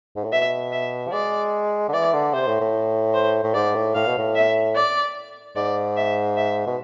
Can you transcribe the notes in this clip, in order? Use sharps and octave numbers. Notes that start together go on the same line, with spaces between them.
G#2
A2
B2 E5
E5
F3
G#3 D5
D3
E3 D5
D3
C3 C5
A2
A2
C5
A2
G#2 D5
A2
A2 F5
B2
A2
E5
D5
G#2 D5
E5
E5
B2